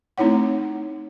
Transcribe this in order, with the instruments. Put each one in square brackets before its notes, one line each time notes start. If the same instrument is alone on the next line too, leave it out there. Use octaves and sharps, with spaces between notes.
[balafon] A3 C4 D#4 E4 C#5 F#5